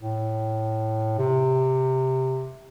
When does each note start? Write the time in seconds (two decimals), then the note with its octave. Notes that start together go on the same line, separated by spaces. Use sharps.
0.01 A2
1.18 C3